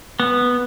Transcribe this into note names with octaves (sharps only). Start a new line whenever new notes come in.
B3